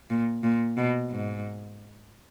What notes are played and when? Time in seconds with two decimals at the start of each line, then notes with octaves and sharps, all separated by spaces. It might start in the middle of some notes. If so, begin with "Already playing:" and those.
0.10 A#2
0.43 A#2
0.77 B2
1.10 G#2